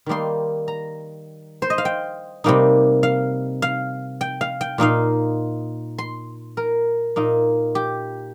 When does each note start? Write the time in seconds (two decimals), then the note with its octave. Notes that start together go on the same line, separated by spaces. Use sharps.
0.06 D#3 G3 A#3 D#4 C6
0.68 A#5
1.62 C5
1.70 D#5
1.78 F5
1.85 G5
2.44 C3 G3 A#3 D#4
3.03 F5
3.62 F5
4.21 G5
4.41 F5
4.61 G5
4.78 A#2 A#3 D#4 F5
5.98 C6
6.57 A#4
7.16 A#2 A#3 D#4
7.75 G4